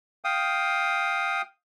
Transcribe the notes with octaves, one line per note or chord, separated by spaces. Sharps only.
F5 G5 D#6